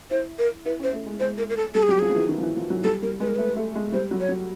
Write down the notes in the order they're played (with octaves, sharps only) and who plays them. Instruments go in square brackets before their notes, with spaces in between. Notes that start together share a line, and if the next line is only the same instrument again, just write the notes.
[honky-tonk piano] E4 [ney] C5
[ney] A#4
[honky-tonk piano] E4 [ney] B4
[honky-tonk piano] C#4 [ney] C5
[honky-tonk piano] A3
G#3
[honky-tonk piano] G#3 [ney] C5
[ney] A#4
A#4
A4
[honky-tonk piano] G3 [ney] A4
[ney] G#4
[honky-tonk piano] F#3 [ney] G4
[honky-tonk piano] F3 [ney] G#4
[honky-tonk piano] F3
E3
D#3
F3
E3
F3
F#3
[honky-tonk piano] G3 [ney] A4
[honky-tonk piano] G3 [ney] A#4
[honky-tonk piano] G#3 [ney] B4
[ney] A#4
[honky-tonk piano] A3 [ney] B4
[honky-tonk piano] A3
G#3
[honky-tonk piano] G3 [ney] C5
[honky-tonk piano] F#3
[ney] C#5
[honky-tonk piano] F#3